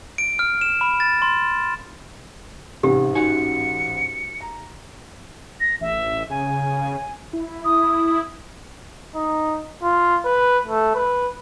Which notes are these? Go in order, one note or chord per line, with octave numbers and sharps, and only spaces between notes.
D7
F6
E7
B5
A6
C6
A1 G#2 C3 G4
D#4 F#4 G#5 C#7
A#5
A#6
A1 E5
C#3 G#5
E4
D#6
D#4
F4
B4
A3
B4